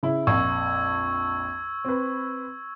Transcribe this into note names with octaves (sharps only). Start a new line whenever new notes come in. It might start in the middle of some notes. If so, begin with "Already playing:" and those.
C#3 E4
A#1 F2 C#6 E6 G#6
C4 B4